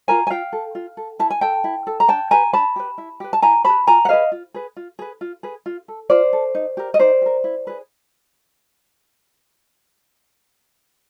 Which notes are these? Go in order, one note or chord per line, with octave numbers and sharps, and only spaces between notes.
F4 A#4 G#5 A#5
G#5
F4 F5 G5
A4
F4
A4
E4 A5
G#5
A4 G5 A5
E4
A4
A#5
D4 G5 A5
G4 B4 G#5 A#5
D4 A5 B5
G4 B4
E4
G4 B4
A5
E4 G#5 A#5
G4 B4 A5 B5
F4 G#5 A#5
F#5
G#4 B4 D#5 F5
F4
G#4 B4
F4
G#4 B4
F4
G#4 B4
F4
A4
F4 C5 D5
A4
D#4
G4 A#4
D#5
D#4 C5 D5
G4
A#4
E4
G#4 B4